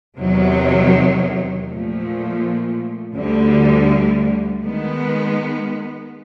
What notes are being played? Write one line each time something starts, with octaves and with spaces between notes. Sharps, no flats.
E2 C3 D#3 F#3
A#2 F3 A3
D2 D3 G3
D#3 G#3 B3